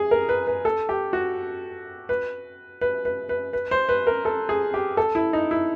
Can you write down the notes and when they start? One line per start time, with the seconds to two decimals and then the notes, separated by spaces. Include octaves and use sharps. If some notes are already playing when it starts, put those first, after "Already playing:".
Already playing: G#4
0.11 A#4
0.29 B4
0.47 B4
0.65 A4
0.89 G4
1.13 F#4
2.09 B4
2.81 B4
3.05 B4
3.29 B4
3.53 B4
3.71 C5
3.89 B4
4.07 A#4
4.25 A4
4.49 G#4
4.74 G4
4.97 A4
5.15 E4
5.33 D#4
5.51 E4